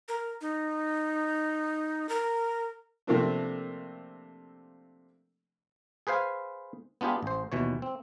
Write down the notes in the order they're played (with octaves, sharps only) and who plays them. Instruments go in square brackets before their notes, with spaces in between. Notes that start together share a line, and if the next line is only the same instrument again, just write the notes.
[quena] A#4
D#4
A#4
[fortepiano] C3 F3 A3 A#3 C4 D4
[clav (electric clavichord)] G#4 B4 C5 F5 G#5
B3 D4 F4 G4 G#4
A1 C5
D#2 B2 E3 C#5
C4